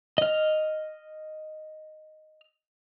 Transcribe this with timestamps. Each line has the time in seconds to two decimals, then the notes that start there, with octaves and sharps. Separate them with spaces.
0.18 D#5 F6